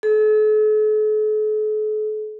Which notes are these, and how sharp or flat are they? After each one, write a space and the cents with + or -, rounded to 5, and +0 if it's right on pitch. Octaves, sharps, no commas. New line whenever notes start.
A4 -45